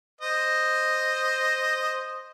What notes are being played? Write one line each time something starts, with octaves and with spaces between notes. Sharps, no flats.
C5 D#5